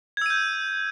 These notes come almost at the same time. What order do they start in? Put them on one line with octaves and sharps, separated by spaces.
G#6 E6 D#7 G6